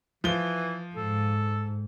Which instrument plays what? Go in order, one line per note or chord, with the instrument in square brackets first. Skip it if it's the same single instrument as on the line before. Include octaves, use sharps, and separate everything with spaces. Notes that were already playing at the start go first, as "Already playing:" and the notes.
[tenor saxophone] E3 [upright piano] F3 G7
[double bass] G#2 [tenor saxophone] A4